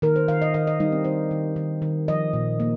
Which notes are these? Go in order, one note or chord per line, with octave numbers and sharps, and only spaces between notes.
D#3 A#4
C5
D#3 F5
D#5
D#3 F5
D#5
G3 D#4
C4
D#3 C5
D#3
D#3
D#3
F3 D#5
A#2
A#3